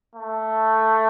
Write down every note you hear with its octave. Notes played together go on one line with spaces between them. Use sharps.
A3